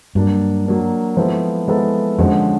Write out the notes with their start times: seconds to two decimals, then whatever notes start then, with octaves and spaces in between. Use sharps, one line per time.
0.15 G2 F#3 A#3 D4
0.66 F#3 A#3 D4
1.17 F3 G#3 B3 E4 A4
1.68 F3 G#3 B3 E4 A4
2.18 F2 D3 F3 G#3 C#4 F#4